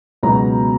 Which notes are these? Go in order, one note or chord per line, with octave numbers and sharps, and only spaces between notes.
C#2 B2 F#3 B3 A#5